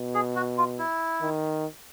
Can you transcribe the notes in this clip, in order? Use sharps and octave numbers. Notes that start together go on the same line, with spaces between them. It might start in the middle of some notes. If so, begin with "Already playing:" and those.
Already playing: B2
G#4
F#4
F4
E4
D#3